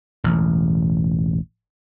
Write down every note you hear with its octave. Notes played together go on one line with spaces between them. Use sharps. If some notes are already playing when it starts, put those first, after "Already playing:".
E1 A1